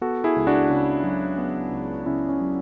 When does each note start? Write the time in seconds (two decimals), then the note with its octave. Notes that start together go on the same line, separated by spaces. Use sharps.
0.01 B3 F#4 A4
0.24 E4 G#4
0.36 C#2
0.47 D4 F#4
0.70 C#3
1.04 F#3
1.38 B3
1.72 C#2
2.06 C#3 C#4 E4
2.29 C#4
2.41 F#3